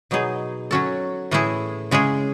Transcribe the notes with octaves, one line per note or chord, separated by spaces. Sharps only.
B2 F#3 B3 D#4 G#4
F#3 C#4 F#4 A4
A2 E3 A3 E4 G#4
C#3 G#3 C#4 G#4